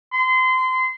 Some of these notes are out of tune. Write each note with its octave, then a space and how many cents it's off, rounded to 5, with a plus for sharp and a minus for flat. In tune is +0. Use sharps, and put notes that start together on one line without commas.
C6 -25